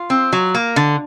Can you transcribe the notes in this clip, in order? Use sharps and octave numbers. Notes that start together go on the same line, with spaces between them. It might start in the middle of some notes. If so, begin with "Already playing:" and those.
Already playing: F4
C4
F#3
A#3
D3